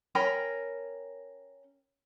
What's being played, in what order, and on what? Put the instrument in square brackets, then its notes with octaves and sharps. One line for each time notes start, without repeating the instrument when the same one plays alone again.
[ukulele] C#4 A#4 G5 B5